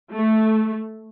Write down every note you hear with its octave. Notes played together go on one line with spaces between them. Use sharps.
A3